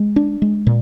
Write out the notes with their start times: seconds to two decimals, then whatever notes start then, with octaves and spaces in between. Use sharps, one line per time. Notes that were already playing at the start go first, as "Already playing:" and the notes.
Already playing: G#3
0.16 D4
0.42 G#3
0.67 A#2